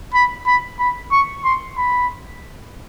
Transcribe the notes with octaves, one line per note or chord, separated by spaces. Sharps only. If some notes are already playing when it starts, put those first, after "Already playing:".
B5
B5
B5
C#6
C6
B5